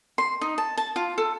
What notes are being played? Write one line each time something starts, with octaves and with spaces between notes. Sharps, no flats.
C6
D#4
A5
A5
F4
A4